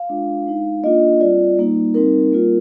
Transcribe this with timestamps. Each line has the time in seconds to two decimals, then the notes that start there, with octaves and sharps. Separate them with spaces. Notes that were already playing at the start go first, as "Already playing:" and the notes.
Already playing: F5
0.09 G#3 D4 F4
0.46 G#3 D#4
0.84 A#3 D4 F4 D#5
1.21 G3 C4 F4 D5
1.58 G3 A#3 D#4
1.94 G3 C4 D#4 A#4
2.32 G3 A#3 F4